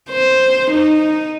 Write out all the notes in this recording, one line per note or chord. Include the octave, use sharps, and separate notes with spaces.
C5
D#4